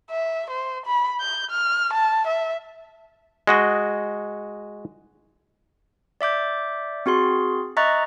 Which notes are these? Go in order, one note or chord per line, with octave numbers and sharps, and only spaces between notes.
E5
C5
B5
G6
F6
A5
E5
G#3 F#4 D#5
D5 E5 D6 G6
C4 F#4 G#4 C6
D#5 E5 A#5 C#6 F#6 A6